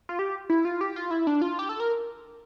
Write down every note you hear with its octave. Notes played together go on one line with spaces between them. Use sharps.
F4
G4
E4
F4
G4
F4
E4
D4
F4
G4
A4
A#4